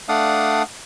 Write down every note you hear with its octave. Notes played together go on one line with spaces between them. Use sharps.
A3 D4 D5 F5 F#5 D#6